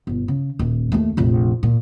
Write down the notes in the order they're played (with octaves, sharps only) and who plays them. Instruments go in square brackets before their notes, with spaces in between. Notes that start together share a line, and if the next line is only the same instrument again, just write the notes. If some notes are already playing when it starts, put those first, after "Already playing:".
[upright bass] G1 B2
C#3
D#1
D#2 A3
F1 A#1
A#2